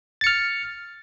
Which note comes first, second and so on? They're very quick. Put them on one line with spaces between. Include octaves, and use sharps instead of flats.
A6 C#7 F6